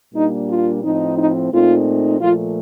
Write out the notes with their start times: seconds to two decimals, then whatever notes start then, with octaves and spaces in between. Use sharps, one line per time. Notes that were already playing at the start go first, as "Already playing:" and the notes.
0.14 A#2 G3 A#3 D4 D#4
0.48 F4
0.83 A2 F3 C4 D#4
1.18 D#4
1.51 A#2 A3 C4 D#4 F4
2.20 A#2 F3 A3 F4